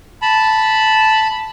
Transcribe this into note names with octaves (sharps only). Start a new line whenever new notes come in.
A5 B5